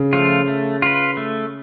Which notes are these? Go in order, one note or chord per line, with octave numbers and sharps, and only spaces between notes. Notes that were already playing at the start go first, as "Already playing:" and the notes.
Already playing: C#3
F3 A3 F4
A3
F4 B4
A3